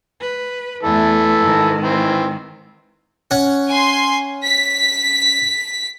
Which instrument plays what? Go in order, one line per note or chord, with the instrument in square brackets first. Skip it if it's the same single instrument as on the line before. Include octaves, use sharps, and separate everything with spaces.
[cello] B4
[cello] E2 A3 [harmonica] E3 A4
[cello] G#2 D#3
[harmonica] E3 C4
[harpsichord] C#4 F#5
[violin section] G#5 C6
B6